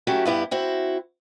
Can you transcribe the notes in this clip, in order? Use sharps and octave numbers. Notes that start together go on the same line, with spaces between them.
F#3 A3 C#4 E4 F#4 G4
G2 B3 E4 G4
C4 E4 F#4